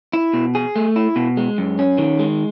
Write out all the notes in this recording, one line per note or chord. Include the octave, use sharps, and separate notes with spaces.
E4
B2
G#4
A3
E4
B2
G#3
F#2
C#4
D#3
G#3